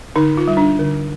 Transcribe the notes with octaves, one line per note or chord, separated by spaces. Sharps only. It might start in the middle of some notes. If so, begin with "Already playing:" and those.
D3 D#4
F4
G3
D4
D3